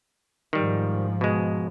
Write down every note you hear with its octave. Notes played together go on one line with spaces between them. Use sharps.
G#2 D#3 F3 G3
B2 G#3